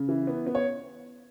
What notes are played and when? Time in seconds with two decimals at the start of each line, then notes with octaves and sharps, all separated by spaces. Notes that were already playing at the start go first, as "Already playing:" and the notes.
Already playing: C#3
0.09 E3
0.27 B3
0.46 B3
0.55 C#5